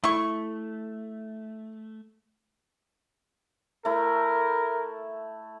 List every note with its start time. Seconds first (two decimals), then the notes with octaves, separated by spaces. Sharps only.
0.04 A3 E4 C#6
3.85 A3 E4 A#4